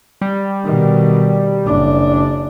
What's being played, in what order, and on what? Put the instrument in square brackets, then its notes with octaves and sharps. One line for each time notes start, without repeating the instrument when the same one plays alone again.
[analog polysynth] G3
[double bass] B2 D#3
F#1 D4